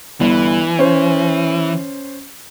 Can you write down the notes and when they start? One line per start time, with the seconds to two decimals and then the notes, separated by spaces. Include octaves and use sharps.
0.21 G1 E3
0.79 C#4 C5